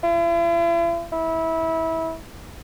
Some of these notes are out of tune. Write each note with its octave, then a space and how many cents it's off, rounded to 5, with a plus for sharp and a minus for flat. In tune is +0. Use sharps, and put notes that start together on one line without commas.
E4 +45
E4 -20